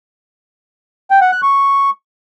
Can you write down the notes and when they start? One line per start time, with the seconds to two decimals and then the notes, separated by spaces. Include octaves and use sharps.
1.11 G5
1.21 F#5
1.32 F#6
1.42 C#6